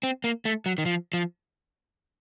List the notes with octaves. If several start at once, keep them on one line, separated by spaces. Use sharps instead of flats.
C4
A#3
A3
F#3
D#3
F3
F3